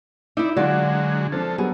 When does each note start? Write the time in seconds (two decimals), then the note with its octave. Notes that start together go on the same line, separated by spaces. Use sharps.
0.37 D#4 E4 D5 E5
0.57 D3 F#3 G#3 F4 F#4 D5
1.32 F3 C4 D4 A4
1.58 F#3 G3 B3 G#4